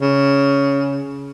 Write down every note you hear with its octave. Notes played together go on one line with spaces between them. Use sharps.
C#3